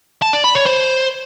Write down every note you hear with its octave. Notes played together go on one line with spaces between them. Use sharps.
A5
D5
B5
C#5
C5